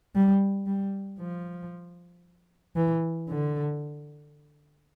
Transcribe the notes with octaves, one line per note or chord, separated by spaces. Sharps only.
G3
G3
F3
E3
D3